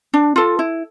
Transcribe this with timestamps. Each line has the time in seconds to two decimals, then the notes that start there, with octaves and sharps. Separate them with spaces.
0.14 D4
0.36 F4 A4
0.59 E4